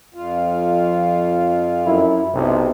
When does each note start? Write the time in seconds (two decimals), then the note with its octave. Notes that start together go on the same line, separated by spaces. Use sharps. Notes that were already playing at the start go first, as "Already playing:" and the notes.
0.14 F2 F4
1.86 F#2 E4
2.33 B1 C3